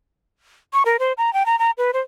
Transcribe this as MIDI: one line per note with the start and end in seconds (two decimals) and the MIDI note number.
0.73 0.83 85
0.86 0.97 70
0.99 1.13 72
1.18 1.33 82
1.33 1.46 79
1.46 1.58 82
1.59 1.71 82
1.78 1.91 71
1.94 2.01 72